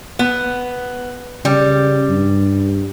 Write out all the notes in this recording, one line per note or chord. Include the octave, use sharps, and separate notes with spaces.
B3
C#3 G3
G2